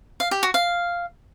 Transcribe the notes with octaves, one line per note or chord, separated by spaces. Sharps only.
F5
G4
F#4
F5